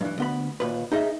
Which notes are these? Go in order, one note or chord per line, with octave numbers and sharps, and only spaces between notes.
G2 E3
D2 B3 B5
D#2 A#2 B4
D#4 G#4 D#5 E5